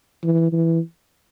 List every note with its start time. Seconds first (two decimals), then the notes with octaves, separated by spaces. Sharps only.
0.23 E3
0.52 E3